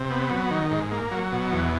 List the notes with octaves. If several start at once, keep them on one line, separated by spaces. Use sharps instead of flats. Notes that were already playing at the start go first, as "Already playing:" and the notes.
Already playing: C3
B3
F#3
D#3
G#2
A#3
F#3
B2
E2